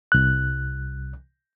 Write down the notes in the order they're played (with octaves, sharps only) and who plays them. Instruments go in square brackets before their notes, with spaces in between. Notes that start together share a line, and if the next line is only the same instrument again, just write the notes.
[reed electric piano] C2 F#6